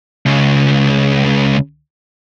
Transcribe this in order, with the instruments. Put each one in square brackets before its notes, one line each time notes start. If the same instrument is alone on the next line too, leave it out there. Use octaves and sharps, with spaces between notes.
[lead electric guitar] C#2 C#3